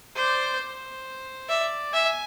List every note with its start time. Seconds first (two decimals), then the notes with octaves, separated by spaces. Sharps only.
0.16 C5 D5
0.60 C5
1.49 D5 E5
1.93 E5 G#5